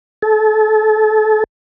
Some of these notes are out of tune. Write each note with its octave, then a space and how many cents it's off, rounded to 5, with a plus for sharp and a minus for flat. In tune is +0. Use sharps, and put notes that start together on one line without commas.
A4 -30